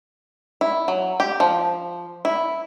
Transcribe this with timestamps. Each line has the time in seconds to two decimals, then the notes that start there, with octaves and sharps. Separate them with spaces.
0.61 E4
0.88 F#3
1.20 G4
1.40 F3
2.25 E4